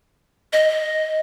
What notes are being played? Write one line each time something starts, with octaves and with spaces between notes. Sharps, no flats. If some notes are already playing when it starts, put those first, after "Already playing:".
D#5